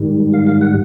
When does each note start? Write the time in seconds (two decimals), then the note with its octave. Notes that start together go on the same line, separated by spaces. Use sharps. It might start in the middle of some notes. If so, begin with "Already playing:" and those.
Already playing: G#2 D#3 G3
0.33 F5
0.47 F5
0.61 F#5